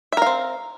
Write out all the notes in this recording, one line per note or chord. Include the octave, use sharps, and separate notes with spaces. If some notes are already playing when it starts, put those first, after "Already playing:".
C4 A#4 E5 F5